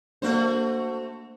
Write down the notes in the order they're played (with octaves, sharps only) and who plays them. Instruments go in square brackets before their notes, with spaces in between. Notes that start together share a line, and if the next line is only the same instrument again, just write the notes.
[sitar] A3 F#4 C5 [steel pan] A#3 D4